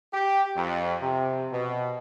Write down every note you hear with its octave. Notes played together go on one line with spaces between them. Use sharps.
G4
F2
C3
B2